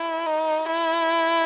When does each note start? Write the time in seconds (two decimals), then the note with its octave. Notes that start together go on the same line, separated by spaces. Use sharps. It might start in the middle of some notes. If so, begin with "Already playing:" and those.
Already playing: E4
0.26 D#4
0.66 E4